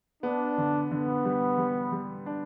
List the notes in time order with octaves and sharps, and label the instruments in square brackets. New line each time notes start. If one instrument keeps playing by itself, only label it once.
[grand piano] B3 [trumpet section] D4
[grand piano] D3
[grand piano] D3 [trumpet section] B3
[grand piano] G3
G3
G3
D4